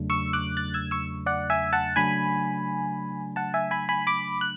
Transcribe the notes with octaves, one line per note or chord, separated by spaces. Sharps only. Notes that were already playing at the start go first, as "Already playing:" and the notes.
Already playing: E2 C#3 F#3 A3 D4
C#6 E6
D6 F#6
F#6 A6
E6 G#6
C#6 E6
D5 F#5
E5 G#5
F#5 A5
C#3 F#3 A3 D4 G#5 B5
F#5 A5
E5 G#5
G#5 B5
G#5 B5
B5 D6
F#6